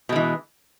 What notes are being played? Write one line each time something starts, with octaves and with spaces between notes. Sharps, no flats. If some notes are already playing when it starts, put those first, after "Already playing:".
B2 E3 G#3